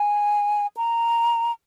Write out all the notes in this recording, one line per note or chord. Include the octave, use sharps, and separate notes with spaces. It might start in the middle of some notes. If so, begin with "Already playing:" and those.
Already playing: G#5
A#5